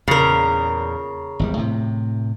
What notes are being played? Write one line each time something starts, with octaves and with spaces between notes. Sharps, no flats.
E2 A#2 C#3 A#4
G#1 E2 G3
A2 C3